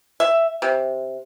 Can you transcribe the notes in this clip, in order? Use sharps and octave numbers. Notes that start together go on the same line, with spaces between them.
E5
C3